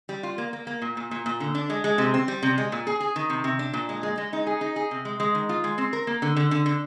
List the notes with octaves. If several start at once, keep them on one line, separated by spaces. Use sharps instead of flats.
G3
F4
A#3
A#3
A#3
A#2
A#2
A#2
A#2
D3
D4
G#3
G#3
C3
C4
G3
C3
G#3
A#2
G#4
G#4
D#3
C3
C3
D4
A#2
G#3
G#3
G#3
D#4
G#4
D#4
G#4
C3
G#3
G#3
D#3
F4
G#3
C4
A#4
A#3
D3
D3
D3
D3